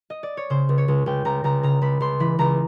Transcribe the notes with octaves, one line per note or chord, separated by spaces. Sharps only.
D#5
D5
C#5
C#3 C5
C#2
C#5
C#2
C#2 G5
C#2 A#5
C#2 A#5
C#3 A#5
C#2 B5
C#2 C6
E3 B5
C#2 A#5